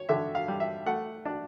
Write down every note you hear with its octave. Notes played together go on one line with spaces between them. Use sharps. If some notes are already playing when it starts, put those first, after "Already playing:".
Already playing: C#5
D3 E5
F5
G3
E5
A3 F#5
D4